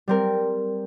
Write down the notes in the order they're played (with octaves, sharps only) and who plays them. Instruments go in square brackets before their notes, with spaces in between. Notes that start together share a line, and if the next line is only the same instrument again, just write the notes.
[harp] G3 C4 A#4